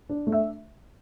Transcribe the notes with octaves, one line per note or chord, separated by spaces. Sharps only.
D4
A3
E5